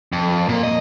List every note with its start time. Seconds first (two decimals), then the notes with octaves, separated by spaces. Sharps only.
0.12 F2
0.49 A#2 A#3
0.63 D#5